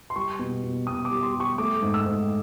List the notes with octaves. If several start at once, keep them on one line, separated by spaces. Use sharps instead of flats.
C6
G3 C#6
B2
B2
B2 D#6
D6
G3
C6
G3
C#6
A3 D6
G#2
E6
G#2